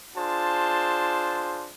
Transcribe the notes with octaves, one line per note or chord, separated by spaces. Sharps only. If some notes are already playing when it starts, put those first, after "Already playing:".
D4 F4 G#4 C5 A5